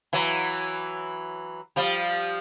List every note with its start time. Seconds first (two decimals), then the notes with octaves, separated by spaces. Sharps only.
0.13 E3 F#3
1.76 F3 G3